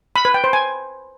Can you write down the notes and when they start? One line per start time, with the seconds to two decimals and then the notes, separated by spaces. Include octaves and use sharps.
0.16 B5
0.25 B4
0.34 G5
0.44 C5
0.53 G#5